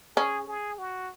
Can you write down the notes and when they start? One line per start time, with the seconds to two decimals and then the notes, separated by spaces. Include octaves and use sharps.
0.17 C#4 G#4
0.47 G#4
0.78 F#4